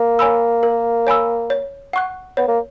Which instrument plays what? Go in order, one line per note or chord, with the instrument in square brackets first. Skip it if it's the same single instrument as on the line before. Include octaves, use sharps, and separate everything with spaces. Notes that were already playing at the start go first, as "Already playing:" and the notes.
Already playing: [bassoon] A#3
[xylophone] C#5 G#5 B5 E6
A#4
C#5 G#5 B5 E6
C#5
F#5 C#6 F#6
[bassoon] B3 [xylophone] C#5
[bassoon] A#3